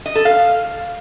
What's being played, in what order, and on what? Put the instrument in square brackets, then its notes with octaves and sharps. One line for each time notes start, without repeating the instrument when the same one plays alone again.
[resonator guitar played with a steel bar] D#5
A4
F5